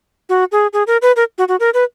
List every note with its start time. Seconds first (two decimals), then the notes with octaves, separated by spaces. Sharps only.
0.29 F#4
0.52 G#4
0.73 G#4
0.87 A#4
1.02 B4
1.16 A#4
1.38 F#4
1.48 F#4
1.60 A#4
1.74 B4